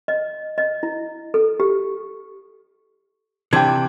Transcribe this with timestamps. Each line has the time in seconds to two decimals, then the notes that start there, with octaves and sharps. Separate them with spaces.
0.08 D#5
0.58 D#5
0.83 E4
1.34 A4
1.60 G4
3.53 C3 E3 D4 G5 G#6